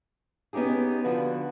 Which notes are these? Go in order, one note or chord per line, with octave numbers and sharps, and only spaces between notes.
B3 C#4 D#4 G4 G#4
D3 F3 F#4 B4